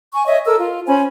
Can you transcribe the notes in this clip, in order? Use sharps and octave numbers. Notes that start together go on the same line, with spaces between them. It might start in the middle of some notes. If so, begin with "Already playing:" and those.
G#5 C#6
C#5 D#5 E5
A4 A#4 E6
F4
C#4 C5 G#5 B5